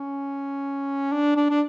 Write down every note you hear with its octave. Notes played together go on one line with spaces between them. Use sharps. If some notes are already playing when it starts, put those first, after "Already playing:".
Already playing: C#4
D4
D4
D4